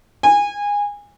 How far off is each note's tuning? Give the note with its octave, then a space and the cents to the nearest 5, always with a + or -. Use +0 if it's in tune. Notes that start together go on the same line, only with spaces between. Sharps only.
G#5 -20